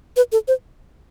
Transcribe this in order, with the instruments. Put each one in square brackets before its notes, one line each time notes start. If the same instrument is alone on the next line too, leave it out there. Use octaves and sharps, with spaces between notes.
[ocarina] B4
A4
C5